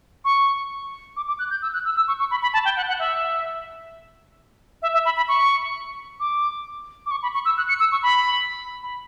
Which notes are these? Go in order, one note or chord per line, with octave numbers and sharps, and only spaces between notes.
C#6
D6
D6
F#6
G6
E6
F#6
E6
E6
C#6
C#6
B5
B5
A5
G5
F#5
F#5
E5
E5
E5
B5
B5
C#6
D6
D6
C#6
B5
C#6
E6
F#6
C#7
E6
C#6
B5
B5